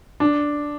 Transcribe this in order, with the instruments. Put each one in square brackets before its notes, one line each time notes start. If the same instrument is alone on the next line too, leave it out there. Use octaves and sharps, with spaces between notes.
[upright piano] D4